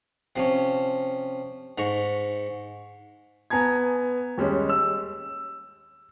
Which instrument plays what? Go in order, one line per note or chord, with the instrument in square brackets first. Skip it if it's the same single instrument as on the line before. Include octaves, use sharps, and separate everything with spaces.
[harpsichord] C3 F3 C#4
G#2 A#5 C#6
[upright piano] B3 G#5 A#5 G#6
D#2 G3 G#3 C#4
E6